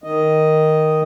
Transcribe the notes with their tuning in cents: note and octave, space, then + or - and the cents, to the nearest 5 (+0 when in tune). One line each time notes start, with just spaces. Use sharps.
D#3 +0 D#5 +0